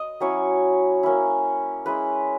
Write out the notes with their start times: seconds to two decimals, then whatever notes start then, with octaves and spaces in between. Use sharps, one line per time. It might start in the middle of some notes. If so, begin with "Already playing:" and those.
Already playing: D#5
0.20 F#3 C#4 E4 C#5
1.03 A#3 C#4 E4
1.86 G#3 C#4 E4 B4